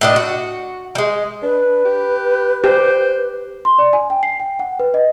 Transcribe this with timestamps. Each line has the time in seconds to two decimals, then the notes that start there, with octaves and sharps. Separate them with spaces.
0.01 A2 D4 D#5
0.16 F#4
0.95 G3 G#3
1.42 D4 B4
1.85 G4
2.64 G4 C5
3.65 C6
3.78 D5
3.93 G#5
4.10 G5
4.23 C7
4.40 G5
4.59 F#5
4.80 B4
4.94 D#5